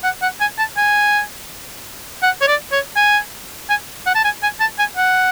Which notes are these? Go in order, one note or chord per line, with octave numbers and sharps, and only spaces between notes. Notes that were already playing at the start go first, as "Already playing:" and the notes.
F#5
F#5
G#5
A5
G#5
F#5
C#5
D5
C#5
G#5
G#5
F#5
A5
G#5
G#5
A5
G#5
F#5